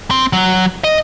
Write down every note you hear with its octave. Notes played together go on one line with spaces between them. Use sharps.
C4
F#3
D#5